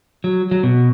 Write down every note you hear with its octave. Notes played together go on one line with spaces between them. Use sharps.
F#3
F#3
B2